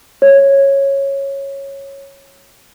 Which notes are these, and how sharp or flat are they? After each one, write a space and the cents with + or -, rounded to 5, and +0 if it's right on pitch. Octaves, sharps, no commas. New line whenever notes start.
C#5 -10